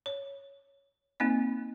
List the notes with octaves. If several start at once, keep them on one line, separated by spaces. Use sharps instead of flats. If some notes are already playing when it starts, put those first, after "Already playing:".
C#5
A#3 C4 D#4 D#5